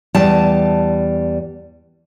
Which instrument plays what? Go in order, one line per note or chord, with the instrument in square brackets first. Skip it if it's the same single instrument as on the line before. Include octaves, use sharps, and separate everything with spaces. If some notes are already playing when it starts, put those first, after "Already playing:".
[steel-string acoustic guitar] E2 G3 A5